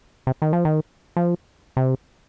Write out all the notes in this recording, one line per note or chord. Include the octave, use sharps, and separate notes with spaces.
C3
D#3
F3
D#3
F3
C3